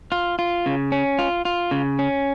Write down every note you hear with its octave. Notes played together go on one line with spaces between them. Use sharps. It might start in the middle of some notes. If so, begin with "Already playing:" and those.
F4
F4
C#3
C#4
F4
F4
C#3
C#4